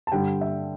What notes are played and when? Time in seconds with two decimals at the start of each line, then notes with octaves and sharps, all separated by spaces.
0.07 A5
0.12 G2 D3 G3 G5
0.41 E5